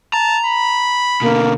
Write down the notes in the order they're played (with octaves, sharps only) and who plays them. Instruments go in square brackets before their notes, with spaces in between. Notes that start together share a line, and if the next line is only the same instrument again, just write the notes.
[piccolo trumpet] A5 [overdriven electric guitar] A#5
[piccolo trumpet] B5
[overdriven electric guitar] B2 D3 [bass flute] A#3